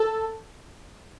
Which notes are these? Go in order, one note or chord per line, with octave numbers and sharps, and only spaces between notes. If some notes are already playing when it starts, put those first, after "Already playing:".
Already playing: A4